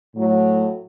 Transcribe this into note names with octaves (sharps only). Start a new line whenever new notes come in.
A2 F#3 A3